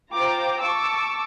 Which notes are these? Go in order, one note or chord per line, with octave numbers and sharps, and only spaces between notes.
F4 C5 G5 A#5 D6
A5 C#6 D6 E6